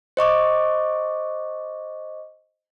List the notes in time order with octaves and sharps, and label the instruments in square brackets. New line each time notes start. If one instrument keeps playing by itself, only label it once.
[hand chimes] C5 D#5 C#6 D6